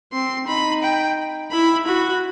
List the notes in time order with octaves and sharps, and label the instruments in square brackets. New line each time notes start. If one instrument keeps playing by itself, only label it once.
[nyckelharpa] C4 [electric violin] C6
[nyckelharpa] D#4 [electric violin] B5
[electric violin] G5
[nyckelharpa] E4 [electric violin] B5
[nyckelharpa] F#4 [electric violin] B5